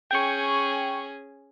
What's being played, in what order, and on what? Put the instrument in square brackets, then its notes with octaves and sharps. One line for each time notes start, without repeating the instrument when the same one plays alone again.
[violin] C#4 G#4 [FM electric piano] G5 C#6